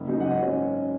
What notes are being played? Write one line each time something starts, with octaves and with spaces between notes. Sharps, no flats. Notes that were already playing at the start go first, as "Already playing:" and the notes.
Already playing: F#1
F#2 F#3 D#4
F#5
G#1 D#5
F#3 C#4